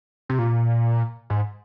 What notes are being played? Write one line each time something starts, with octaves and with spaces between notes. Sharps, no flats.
C3
A#2
G#2